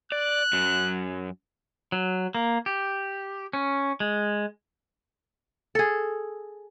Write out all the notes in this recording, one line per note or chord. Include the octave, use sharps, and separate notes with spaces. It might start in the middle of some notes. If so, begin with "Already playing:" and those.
D5 F#6
F#2 F#3
F#3
A#3
G4
C#4
G#3
G#4 A4